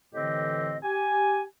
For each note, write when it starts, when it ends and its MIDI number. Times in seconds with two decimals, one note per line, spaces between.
0.13 0.77 45
0.13 0.77 50
0.13 0.77 52
0.13 0.77 60
0.13 0.77 67
0.13 0.77 75
0.83 1.42 67
0.83 1.42 80